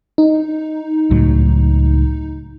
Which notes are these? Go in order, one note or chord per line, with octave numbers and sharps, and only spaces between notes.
D#4
C#2 A2 F#3